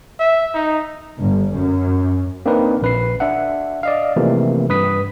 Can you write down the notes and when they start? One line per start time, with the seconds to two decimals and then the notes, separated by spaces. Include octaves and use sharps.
0.20 E5
0.54 D#4
1.19 G1
1.53 F#2
2.46 A#3 C4 D4 D#4 A#4 B4
2.82 A#1 B4 C7
3.20 D4 E5 F#5
3.83 D5 D#5 F5
4.16 C3 E3 F3 A3 A#3
4.69 G2 B4 D#6 B6